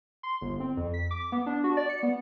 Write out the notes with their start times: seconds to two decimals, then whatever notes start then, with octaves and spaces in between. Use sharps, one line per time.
0.23 C6
0.42 G1
0.60 C4
0.77 F2
0.94 B6
1.11 D6
1.32 B3
1.46 D4
1.64 F#4
1.77 D5
1.89 C#7
2.03 B3